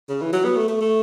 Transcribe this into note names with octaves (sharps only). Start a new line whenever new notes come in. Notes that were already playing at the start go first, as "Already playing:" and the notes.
C#3
E3
F#3
B3
A3
A3
A3